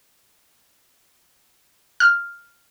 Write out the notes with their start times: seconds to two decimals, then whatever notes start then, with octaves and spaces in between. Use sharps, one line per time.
2.00 F6